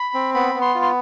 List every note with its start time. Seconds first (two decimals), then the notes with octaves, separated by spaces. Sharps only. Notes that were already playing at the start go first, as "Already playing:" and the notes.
Already playing: B5
0.14 C4
0.34 B3 B5
0.55 B3
0.61 C6
0.75 F4
0.83 C6